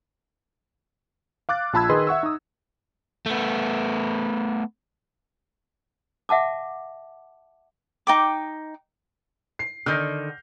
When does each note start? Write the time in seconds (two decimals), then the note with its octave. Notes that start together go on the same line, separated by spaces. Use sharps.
1.49 F5 D6 F#6 A6
1.73 A#1 F4 A5 B5 E6 G#6
1.89 D#3 G#4 B4 D#5 C6
2.07 E5 F#5 C#6 E6
2.23 D#4 D#6
3.26 A3 B3
6.29 E5 F#5 A5 D6
8.07 D#4 G5 D6
9.59 C7
9.86 D3 D#3 F6 G6 A#6